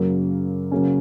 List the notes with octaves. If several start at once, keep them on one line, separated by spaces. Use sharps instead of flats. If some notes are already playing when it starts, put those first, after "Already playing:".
Already playing: F#2 C#3 F#3 A#3
C#3 F#3 A#3 C#4